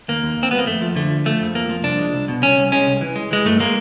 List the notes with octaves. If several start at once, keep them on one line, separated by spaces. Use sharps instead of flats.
D#2 A#3
D#2
D#2 C4
G3 B3
A#3
F2 A3
F3
D3 A3
F3
F3 A3
F2
F2 A#3
F3
C2 D4
G#3
C2
B2
C2 C#4
C2
G#3 C#4
C2
E3
G#3
E3 G#3
G2 A3
G#3 A#3